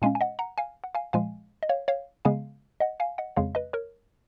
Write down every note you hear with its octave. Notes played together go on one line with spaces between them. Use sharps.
A#2 G#3 C#4 F5 G#5
G#5
D#5 F#5
F#5 A#5
F5 G#5
F#5
F5 G#5
A#2 F3 G#3 F5 G#5
D#5
C#5 F5
C#5 F5
C#3 G#3 B3 F5 G#5
D#5 F#5
F5 G#5
D#5 F#5
F2 C#3 G#3 C#5 F5
B4 D#5
A#4 C#5